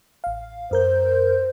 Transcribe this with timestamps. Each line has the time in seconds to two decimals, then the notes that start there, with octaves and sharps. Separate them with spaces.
0.24 A1 F5
0.71 F#2 A#4 C5 G6